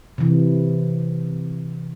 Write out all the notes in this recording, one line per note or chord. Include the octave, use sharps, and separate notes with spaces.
C3 E3